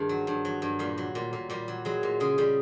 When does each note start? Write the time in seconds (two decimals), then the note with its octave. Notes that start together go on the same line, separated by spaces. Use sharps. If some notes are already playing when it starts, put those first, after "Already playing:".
Already playing: G2 D#3 G#3
0.09 F#3
0.27 G2
0.45 F#3
0.62 G2
0.79 A#2 G3
0.98 F#3
1.15 A#2
1.33 A#2
1.50 A#2 G3
1.68 F#3
1.85 F#3 G#3
2.03 A#2
2.20 C#3 G#3
2.38 C#3 G3